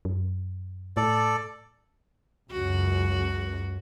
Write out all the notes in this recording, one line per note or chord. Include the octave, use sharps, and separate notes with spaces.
F#2
A2 A4 D5
C#2 F#2 F#4